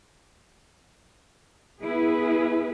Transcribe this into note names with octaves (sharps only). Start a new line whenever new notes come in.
B3 E4 G#4 B4